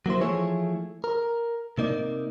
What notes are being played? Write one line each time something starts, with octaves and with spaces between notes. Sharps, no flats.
F#3 A#3 E4 C5
E3 F3 A3 E4 G#4 C#5
A#4
C3 A#3 D#4 D5